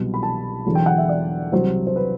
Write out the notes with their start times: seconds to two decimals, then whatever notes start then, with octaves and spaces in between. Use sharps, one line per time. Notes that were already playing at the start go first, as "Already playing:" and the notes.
Already playing: C2 B2 F#3
0.14 B5
0.23 A5
0.66 E1 E2 D3 F#3
0.75 G5
0.86 F#5
0.98 E5
1.09 D5
1.52 C2 C3 F#3 C5
1.87 C5
1.96 B4